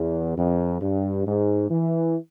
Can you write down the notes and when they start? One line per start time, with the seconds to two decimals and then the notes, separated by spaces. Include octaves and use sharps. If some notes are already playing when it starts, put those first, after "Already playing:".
Already playing: E2
0.37 F2
0.82 G2
1.27 G#2
1.70 E3